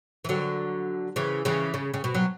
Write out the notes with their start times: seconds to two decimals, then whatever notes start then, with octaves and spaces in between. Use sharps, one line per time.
0.25 E3
0.29 D3 F#3
1.16 C#3 E3
1.45 C#3 E3
1.74 C#3
1.94 C#3
2.04 B2
2.14 F#3